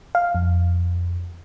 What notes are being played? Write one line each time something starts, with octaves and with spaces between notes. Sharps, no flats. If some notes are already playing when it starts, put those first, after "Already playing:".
F5
F2